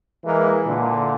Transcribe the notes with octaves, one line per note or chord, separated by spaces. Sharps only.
E3 G#3 A#3
A#2 D3